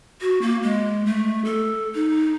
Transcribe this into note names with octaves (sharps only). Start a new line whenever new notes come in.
F#4
A#3
G#3
A3
A4
D#4